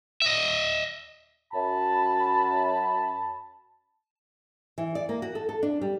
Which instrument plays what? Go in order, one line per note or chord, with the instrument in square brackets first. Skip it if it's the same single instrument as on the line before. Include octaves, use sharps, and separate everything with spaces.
[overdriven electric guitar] D#5 E5
[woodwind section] F#2 B5 [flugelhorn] A5
[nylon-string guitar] E3
D5
A#3
F#4
A4
A4
D4
G3